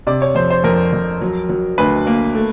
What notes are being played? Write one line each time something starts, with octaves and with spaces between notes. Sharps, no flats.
C3 D5
C#5
F2 C5
C5
F2 A#4
F2
F#3
F#3
D2 B4
A#3
A3